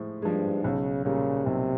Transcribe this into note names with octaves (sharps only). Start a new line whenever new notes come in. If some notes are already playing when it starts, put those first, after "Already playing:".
Already playing: A2 F3 G#3
G2 F3 G#3
B1 C#3
A#2 C#3 G3 A#3
B1 C3